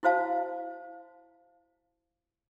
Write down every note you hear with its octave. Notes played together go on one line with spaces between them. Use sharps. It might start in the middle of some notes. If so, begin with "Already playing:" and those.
E4 F#4 C5 F5 A5